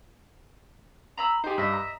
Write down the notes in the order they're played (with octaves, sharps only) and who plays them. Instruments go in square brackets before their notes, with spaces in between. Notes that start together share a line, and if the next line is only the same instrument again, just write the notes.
[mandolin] A#5 B5 E6
[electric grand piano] D#4 G4 [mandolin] G#4 C5
[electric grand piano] G2 [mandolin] D#5 E5
[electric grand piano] A#5